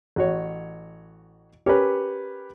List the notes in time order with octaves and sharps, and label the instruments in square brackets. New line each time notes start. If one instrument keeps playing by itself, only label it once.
[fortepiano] A1 F#4 C#5
[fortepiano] C#4 A#4 C#5 [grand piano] G4 B4